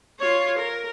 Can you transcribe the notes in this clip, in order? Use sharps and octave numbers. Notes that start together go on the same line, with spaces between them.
F4 C#5
A#4